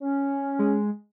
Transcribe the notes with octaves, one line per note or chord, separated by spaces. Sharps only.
C#4
G#3